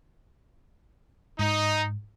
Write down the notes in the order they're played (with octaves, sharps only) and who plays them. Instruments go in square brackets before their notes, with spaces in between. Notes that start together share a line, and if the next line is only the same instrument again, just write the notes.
[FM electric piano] G#2 [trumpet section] D#4